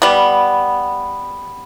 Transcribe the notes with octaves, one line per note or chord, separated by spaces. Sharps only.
G3 B3